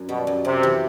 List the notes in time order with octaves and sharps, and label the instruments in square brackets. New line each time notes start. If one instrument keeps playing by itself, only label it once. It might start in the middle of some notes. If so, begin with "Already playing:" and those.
Already playing: [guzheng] F#2
[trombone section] B2 [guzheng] G3
[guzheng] F#2
[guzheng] F#2 [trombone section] C3
[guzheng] E3